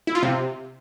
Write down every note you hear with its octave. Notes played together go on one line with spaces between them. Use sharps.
E4
F4
C3